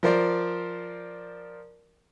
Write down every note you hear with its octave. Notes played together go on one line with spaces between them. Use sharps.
F3 A#4 C5 D5